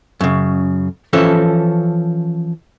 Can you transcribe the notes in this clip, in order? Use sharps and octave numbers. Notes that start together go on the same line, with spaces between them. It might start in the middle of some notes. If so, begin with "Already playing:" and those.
F#2 C#3
E3 F3 C#4 A4